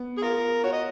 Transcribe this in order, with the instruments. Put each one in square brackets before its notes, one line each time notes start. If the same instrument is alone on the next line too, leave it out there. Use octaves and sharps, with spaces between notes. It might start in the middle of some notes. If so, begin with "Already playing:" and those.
Already playing: [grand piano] B3
[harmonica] G#4
[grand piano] F4 [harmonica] A#4
[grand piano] F#4 [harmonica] C#5
[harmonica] D#5